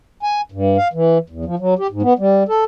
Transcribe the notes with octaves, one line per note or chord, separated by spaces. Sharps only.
G#5
G2
F5
E3
E2
F3
F#3
G4
G#2
B3
G3
A4